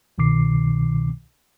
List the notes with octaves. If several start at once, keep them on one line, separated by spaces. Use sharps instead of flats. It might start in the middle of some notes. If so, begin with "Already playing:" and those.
C2 B2 D#3 D6 C7